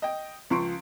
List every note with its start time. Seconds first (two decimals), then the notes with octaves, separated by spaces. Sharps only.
0.02 D#5 G5
0.50 C#2 F3 C6 C#6 D7